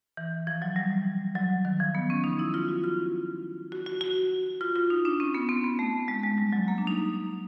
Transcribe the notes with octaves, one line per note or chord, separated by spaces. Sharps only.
E3
F3
F#3
G3
F#3
D#3
F3
B3
C#4
D#4
E4
F4
F#4
F4
F#4
F#4
F#4
F4
F4
D#4
D4
C#4
B3
C4
B3
A3
G#3
G#3
G3
F#3
A#3
D4
D#4